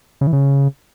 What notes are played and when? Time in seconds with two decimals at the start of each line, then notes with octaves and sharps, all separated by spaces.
0.21 C#3
0.27 E3
0.33 C#3